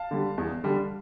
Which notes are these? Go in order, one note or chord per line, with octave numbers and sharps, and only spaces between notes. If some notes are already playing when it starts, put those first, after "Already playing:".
Already playing: F5 A5
D3 G3
E2
D3 G3